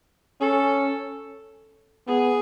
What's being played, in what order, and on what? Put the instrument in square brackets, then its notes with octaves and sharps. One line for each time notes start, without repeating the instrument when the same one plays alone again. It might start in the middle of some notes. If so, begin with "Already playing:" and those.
[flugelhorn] C#4 [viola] A4
[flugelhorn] B3 [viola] G#4